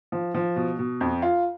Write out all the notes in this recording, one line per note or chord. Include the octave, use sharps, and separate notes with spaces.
F3
F3
B2
B2
F2
F4